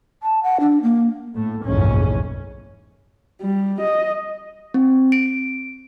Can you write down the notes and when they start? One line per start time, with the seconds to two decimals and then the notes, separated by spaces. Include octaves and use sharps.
0.23 A5
0.43 F#5
0.60 D4
0.83 A#3
1.34 A2 A3
1.64 F#1 B1 F2 G#2 E3 C#4
3.41 G3
3.81 D#5
4.74 C4
5.12 D7